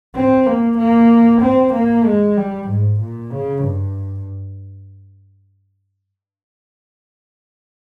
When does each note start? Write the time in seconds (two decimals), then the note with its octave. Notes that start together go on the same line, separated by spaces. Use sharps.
0.15 C4
0.46 A#3
0.78 A#3
1.42 C4
1.74 A#3
2.05 G#3
2.37 G3
2.68 G#2
3.00 A#2
3.32 C#3
3.63 G2